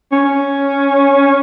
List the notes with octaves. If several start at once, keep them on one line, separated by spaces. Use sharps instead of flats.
C#4